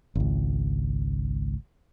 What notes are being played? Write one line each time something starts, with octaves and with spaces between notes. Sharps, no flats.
G#1 C#2